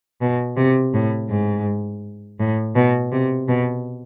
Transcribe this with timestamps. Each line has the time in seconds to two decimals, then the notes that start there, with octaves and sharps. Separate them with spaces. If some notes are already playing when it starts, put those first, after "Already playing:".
0.22 B2
0.57 C3
0.94 A2
1.30 G#2
2.40 A2
2.76 B2
3.12 C3
3.48 B2